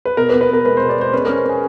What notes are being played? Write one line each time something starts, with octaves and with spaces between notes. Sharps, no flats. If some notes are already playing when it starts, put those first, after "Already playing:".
B4
B2 A#4
B4
B3
B4
B3 A#4
G#3 B4
C5
B2
D5
G#3 C5
C#4 B4
A#4
C#4
C#4 G#4